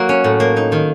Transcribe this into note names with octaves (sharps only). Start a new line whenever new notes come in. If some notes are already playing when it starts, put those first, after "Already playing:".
Already playing: F#3 A#3 F#4 A#4
C#4
A2
A#3
D#4
D#3